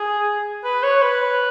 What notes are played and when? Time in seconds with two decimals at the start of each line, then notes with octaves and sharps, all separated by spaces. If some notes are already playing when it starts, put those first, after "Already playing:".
Already playing: G#4
0.64 B4
0.83 C#5
1.02 B4